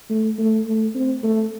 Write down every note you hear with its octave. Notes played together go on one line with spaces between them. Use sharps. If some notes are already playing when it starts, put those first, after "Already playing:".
A3
A3
A3
C4
A3